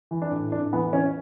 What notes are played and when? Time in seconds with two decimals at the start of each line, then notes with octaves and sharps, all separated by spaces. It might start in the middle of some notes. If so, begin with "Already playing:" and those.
0.11 E3
0.22 D4
0.31 A2
0.52 A2 D4
0.73 E3 B3
0.93 E3 C#4